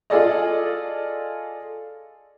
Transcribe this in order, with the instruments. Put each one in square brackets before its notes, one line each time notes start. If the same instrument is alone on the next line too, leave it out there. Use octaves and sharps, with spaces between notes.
[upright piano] F4 G#4 A4 D5 D#5